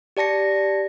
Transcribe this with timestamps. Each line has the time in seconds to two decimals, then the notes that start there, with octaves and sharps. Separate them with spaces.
0.17 G4 D5 A5 A#6 C#7